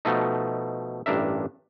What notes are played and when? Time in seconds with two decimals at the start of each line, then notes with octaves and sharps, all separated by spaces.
0.05 B2 F3 A3 D#4
1.06 A1 G2 D4 A#4 E5